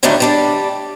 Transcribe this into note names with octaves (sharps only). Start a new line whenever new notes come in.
A2 D3 D#3 F#3 G3 A3
G3 D4 D5